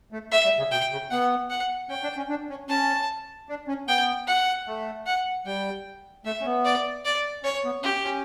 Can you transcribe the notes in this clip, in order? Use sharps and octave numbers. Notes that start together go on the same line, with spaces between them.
A3
A3 E5
G3
C#3
B2 G5
C#3
B3 F#5
F#5
C#4 G5
D4
C#4
D4
C#4
C#4 A5
D4
C#4
B3 G5
F#5
A3
F#5
G3 G5
A3 E5
C#4
B3
D5
D5
C#4 C#5
B3
C#4 G4
C#4